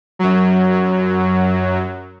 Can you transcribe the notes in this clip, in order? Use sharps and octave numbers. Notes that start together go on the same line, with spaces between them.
F#2 F#3